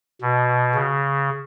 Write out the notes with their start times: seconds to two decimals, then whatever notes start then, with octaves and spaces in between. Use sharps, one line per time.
0.22 B2
0.75 C#3